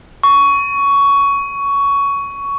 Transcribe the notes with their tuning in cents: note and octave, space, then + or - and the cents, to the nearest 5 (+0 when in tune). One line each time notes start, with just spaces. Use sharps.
C#6 +15